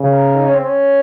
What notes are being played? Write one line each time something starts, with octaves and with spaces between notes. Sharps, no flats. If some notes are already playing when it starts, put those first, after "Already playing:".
Already playing: C#3
A#4
D#4
C#4
C4
C#4